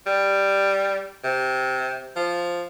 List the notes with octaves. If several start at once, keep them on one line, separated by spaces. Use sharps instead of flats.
G3
C3
F3